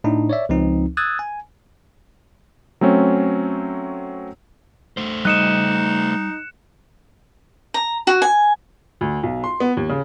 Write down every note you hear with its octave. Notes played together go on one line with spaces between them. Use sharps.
A2 D4 D#4
C#5 D5 E5
C#2 F3 C4 D#4
D#6 E6 F#6 G#6 A6
G#5
F#3 A3 C4 C#4 C#5
A3 C5
G3 D#4 D#5 F#6 C#7 E7
A#5
F#4
G#5
D2
B1
C6
B3
D#2
C#3